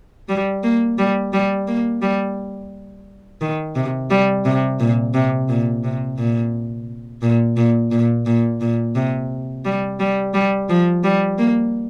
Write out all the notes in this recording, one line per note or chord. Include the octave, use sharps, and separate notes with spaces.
G3
A#3
G3
G3
A#3
G3
D#3
C3
G3
C3
A#2
C3
A#2
C3
A#2
A#2
A#2
A#2
A#2
A#2
C3
G3
G3
G3
F3
G3
A#3